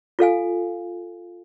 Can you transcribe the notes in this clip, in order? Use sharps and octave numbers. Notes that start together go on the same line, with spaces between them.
F4 A4 F5 G#5